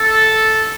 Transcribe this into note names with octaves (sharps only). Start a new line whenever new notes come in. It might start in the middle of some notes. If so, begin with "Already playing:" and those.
Already playing: A4